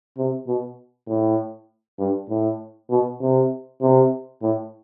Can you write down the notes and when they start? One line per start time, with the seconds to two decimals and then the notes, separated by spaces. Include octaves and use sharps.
0.17 C3
0.47 B2
1.08 A2
1.99 G2
2.29 A2
2.90 B2
3.21 C3
3.81 C3
4.42 A2